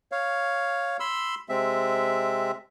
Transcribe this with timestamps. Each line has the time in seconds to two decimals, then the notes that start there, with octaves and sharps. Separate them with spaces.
0.12 C#5 F5
1.00 B5 C6 E6
1.49 C3 G#3 C4 E5